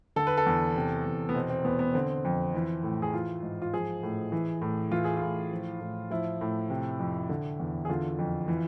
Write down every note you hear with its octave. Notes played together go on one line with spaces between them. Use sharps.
D3 A4
B4
A4
E2
C3
E2
B3
B2 C4
C4
E2 B3
B3
D3 C4
F2
E3
A2
G#4
E3 F4
G#2
F4
F3 G#4
A2
E3
A2
E3 F4
G#4
F4
A2
F3
A2
F3 E4
A2
C3
F2
D3
E2
G#4
D3 F4
F2
E3